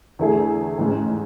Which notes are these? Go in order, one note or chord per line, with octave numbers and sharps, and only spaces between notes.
E2 D3 A3 E4 G#4
A1 G#2 G#3 C#4